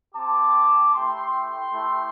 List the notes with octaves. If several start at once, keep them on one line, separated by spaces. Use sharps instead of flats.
C4 G4 A5 D6
A3 E4 G4 G5 C6
A3 E4 G4